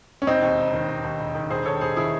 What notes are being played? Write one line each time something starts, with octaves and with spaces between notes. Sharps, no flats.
C#4
E1 C4 D#4
D#2
E1
D#3
E1
D#2
E1
D#3
E1 G#4 C5
D#2 A4 C#5
E1 G#4 C5
D#3 E4 G#4